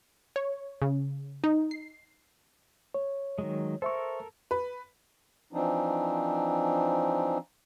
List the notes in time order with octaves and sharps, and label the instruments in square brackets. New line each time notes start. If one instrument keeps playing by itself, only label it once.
[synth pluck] C#5
C#3
D#4
C7
[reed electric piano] C#5
[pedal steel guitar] D#3 F#3 G#3
[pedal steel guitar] A4 A#4 [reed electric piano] C5 E5 C#6
[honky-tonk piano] B4
[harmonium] E3 F3 C4 D4 D#4